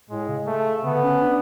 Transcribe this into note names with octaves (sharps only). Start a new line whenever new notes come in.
A2 G#3
C#3
A3
D3 B3
C#4
D4